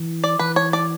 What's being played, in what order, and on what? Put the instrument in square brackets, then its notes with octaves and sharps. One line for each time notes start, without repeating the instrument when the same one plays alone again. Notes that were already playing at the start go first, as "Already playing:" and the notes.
Already playing: [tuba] E3
[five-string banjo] D5
[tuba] E3 [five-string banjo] B4
[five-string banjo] C#5
D5